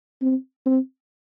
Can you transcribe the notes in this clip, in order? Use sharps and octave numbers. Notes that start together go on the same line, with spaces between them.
C4
C4